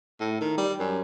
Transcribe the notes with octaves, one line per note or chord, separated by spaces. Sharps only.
A2
D#3
G3
F#2